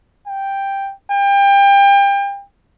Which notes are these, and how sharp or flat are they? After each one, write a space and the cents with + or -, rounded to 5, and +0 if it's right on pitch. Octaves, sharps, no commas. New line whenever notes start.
G5 +5
G5 +30